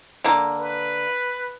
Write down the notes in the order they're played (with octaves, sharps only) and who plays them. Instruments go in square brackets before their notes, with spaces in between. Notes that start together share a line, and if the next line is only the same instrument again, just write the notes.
[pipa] D3 A#3
[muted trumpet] B4